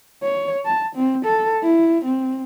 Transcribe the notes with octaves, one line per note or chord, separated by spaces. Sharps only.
C#5
A5
C4
A4
E4
C4